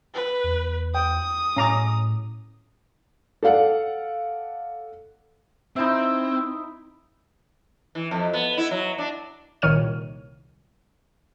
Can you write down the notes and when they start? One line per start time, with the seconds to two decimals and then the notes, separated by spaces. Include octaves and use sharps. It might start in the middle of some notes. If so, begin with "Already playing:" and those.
0.15 B4
0.44 E2
0.95 G5 D#6
1.57 A2 C#4 A#5 D6
3.43 A4 D5 F5 F#5
5.76 C4 D#4 E4 E5
7.95 E3
8.11 F2
8.33 B3
8.57 E4
8.71 F#3
8.98 D4
9.62 C2 A#2 D#3 C#5 F6 D#7